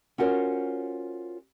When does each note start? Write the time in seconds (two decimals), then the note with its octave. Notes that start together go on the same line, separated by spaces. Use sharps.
0.18 C#4 F4 F#4 A#4 C5 C#5